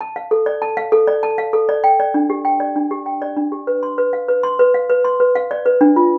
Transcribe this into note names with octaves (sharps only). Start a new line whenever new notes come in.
A5
F5
A4
D5
A5
F5
A4
D5
A5
F5
A4
D5
G5
D5
D4
G4
G5
D5
D4
G4
G5
D5
D4
G4
B4
C6
B4
F5
B4
C6
B4
F5
B4
C6
B4
F5
D5
B4
D4
F4